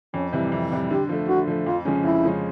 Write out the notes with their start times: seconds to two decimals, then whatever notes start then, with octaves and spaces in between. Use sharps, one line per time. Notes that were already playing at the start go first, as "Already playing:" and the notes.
0.14 F2 C#4
0.33 C3 E3 G3
0.52 F2
0.71 C3 E3 G3
0.90 D3 G4
1.09 F3 A3
1.28 D3 F#4
1.47 F3 A3
1.66 F2 F4
1.85 C#3 F3 G#3 C#4
2.04 F2 E4
2.24 C#3 F3 G#3 C#4